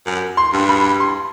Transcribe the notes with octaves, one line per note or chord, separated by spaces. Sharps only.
F#2
C6
G2
B5
C6